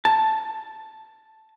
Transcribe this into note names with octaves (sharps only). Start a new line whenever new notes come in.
A5